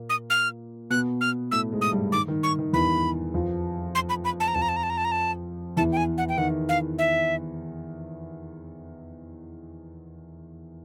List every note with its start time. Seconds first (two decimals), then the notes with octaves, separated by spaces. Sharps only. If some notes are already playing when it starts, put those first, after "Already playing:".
Already playing: A#2 A#3
0.10 D#6
0.30 F6
0.90 B2 B3 F#6
1.21 F6
1.51 A2 A3 E6
1.72 G#2 G#3
1.81 D#6
1.92 G2 G3
2.12 D#3 D6
2.28 D#3
2.43 C#6
2.59 D#3
2.73 E2 E3 B5
3.34 F2 F3
3.95 C6
4.09 B5
4.25 B5
4.40 A5
4.48 A#5
4.55 F2 F3 A5
4.62 A#5
4.69 A5
4.76 A#5
4.83 A5
4.90 A#5
4.98 A5
5.05 A#5
5.12 A5
5.77 E2 E3 A5
5.92 G5
5.97 G#5
6.18 F#5
6.29 G5
6.37 D#3 F#5
6.69 F5
6.99 E5